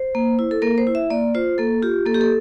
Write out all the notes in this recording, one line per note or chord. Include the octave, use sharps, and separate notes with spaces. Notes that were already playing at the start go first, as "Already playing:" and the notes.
Already playing: C5
A#3
E4
A4
A#3 A#4
C5
E4
E5
A#3 D5
F4 C5
A#3 A4
F4 G4
A#3 A4
G4
A4